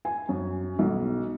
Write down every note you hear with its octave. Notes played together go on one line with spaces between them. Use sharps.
G#5
F#2
B1